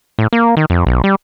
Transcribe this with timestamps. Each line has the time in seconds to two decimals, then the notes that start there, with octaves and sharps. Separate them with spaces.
0.19 A2
0.33 A#3
0.57 D#3
0.70 F2
0.87 B1
1.04 G3